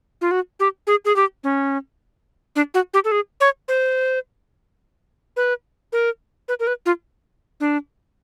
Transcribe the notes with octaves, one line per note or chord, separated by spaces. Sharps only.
F4
F#4
G4
G#4
G#4
G4
C#4
D4
F#4
G4
A4
G#4
C#5
C5
B4
A#4
B4
A#4
B4
F4
D4